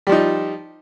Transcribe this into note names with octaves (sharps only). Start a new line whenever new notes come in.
F3 G3 D#4